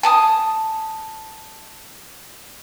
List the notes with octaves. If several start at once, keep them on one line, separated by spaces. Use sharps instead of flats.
G#5 A5 D#6